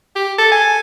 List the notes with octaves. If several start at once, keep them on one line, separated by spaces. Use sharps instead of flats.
G4
A4
G#5